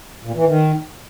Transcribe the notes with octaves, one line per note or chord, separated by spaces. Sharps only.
A#2
E3
D#3